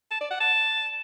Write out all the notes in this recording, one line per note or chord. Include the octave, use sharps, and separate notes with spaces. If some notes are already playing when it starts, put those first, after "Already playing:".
A5
D5
F#5
A5